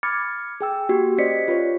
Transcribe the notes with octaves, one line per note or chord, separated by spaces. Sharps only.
B5 D6 F6 G#6 A6 C#7
G#4 G5 E6
A#3 F#4 G4
C#4 C5 D5 D#5 B6 C#7
F4 G4 B4 C#5